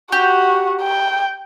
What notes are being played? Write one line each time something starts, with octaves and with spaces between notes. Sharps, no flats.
F#4 G4
G5